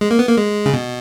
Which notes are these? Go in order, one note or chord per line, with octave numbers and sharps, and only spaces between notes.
G#3
A#3
B3
A#3
G#3
C#3
B2